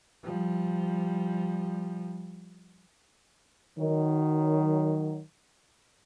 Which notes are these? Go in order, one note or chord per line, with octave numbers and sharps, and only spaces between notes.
F3 G3
D#3 F#3